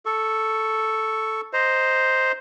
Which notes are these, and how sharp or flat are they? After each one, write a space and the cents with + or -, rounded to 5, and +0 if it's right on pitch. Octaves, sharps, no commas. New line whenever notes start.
A4 +0 C#6 +0
C5 +0 D#5 +0 A#5 +0